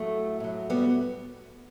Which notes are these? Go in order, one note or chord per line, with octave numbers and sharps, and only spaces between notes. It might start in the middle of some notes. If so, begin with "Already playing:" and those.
Already playing: A2 F#3 A3
A2 F#3
G3 B3